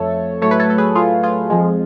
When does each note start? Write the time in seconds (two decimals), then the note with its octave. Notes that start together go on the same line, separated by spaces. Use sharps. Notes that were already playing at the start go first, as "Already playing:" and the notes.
Already playing: F2 A3 A4 C#5
0.42 A2 F#3 A3 A4 C#5
0.51 B4
0.60 A4 C#5
0.70 A4
0.78 G#4 B4
0.95 F4 G#4
1.23 F4 G#4
1.50 F2 F3 G#3